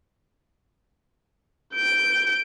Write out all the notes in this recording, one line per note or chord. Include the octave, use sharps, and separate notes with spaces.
G6 D7